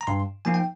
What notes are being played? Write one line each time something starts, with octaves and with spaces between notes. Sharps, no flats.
A#5
G2 C6
F3 A#3 D#4 G#5
G5